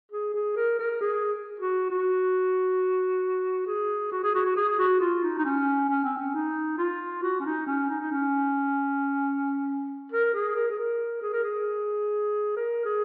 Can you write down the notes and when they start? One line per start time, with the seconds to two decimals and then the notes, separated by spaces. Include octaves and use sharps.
0.12 G#4
0.34 G#4
0.57 A#4
0.79 A#4
1.01 G#4
1.60 F#4
1.90 F#4
3.67 G#4
4.12 F#4
4.24 G#4
4.35 F#4
4.45 F#4
4.56 G#4
4.79 F#4
5.01 F4
5.23 D#4
5.38 D#4
5.45 C#4
5.89 C#4
6.04 C4
6.17 C#4
6.34 D#4
6.78 F4
7.22 F#4
7.40 C#4
7.46 D#4
7.67 C#4
7.89 D#4
8.00 D#4
8.11 C#4
10.12 A#4
10.34 G#4
10.56 A#4
10.70 G#4
10.78 A#4
11.22 G#4
11.33 A#4
11.43 G#4
12.57 A#4
12.85 G#4